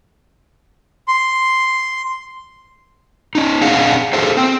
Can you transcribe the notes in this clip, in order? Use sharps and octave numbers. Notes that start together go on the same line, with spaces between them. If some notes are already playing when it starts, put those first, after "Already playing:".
C6
C#4 D#4
C4 D4 G#4 F5 F#5
F#4 G#4 A4 C5 F5
C4